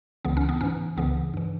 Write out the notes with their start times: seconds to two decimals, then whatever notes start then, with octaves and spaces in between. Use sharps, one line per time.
0.25 C#2 C#3 E3 B3
0.37 C#4
0.49 B3
0.61 G#2 E3 C#4
0.97 C#2 C#3 E3 B3
1.34 G2 E3